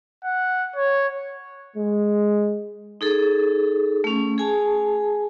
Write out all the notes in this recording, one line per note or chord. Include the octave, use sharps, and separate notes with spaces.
F#5
C#5
G#3
D#4 G#4 A4
A3 C#4
G#4 G#5 A5